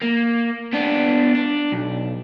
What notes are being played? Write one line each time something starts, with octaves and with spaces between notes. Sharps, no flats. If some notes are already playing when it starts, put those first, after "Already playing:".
A#3
B3 D4
D4
B1